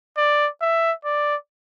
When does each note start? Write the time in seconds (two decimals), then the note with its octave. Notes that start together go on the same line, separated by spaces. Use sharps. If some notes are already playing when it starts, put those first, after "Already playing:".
0.17 D5
0.62 E5
1.05 D5